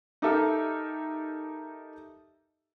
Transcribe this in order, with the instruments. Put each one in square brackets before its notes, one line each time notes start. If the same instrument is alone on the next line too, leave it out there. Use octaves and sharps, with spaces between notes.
[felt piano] D#4 G4 A4 A#4 E5